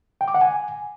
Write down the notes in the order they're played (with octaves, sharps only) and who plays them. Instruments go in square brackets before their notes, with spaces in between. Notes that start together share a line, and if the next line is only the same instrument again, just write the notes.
[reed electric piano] G5
D6
F#5
G#5